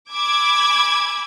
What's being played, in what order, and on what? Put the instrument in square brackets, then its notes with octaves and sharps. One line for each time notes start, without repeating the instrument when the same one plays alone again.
[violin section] G#5 B5 D6 E6 G#6